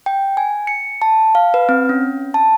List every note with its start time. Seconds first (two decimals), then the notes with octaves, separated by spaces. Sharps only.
0.06 G5
0.37 G#5
0.67 C#7
1.02 A5
1.35 F5
1.54 B4
1.69 C4
1.89 C#4
2.34 A5